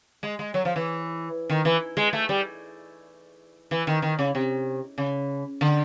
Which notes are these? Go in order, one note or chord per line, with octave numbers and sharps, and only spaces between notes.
G#3
G#3
F#3
F3
E3
D#3
E3
G#3
A3
G3
E3
D#3
D#3
C#3
C3
C#3
D3